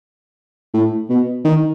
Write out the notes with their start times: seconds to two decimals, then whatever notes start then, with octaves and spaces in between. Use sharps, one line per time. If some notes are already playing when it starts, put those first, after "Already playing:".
0.74 A2
1.10 B2
1.45 D#3